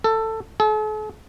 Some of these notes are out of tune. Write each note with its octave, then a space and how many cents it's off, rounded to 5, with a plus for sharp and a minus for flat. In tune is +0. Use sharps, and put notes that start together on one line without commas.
A4 +15
A4 -45